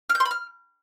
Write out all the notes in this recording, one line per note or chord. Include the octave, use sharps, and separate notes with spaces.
F6
G6
C6
B5
F6